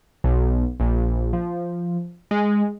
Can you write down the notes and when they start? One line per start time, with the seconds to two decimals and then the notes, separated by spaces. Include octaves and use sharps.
0.24 B1
0.80 A#1
1.33 F3
2.31 G#3